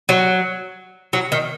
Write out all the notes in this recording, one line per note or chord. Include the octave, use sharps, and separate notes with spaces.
F#3
F#3
D#3